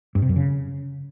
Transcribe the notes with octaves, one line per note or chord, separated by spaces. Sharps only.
G2
C3
F#2
C#3